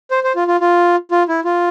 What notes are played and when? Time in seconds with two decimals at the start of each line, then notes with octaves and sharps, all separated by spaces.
0.11 C5
0.24 C5
0.36 F4
0.48 F4
0.61 F4
1.11 F4
1.29 E4
1.45 F4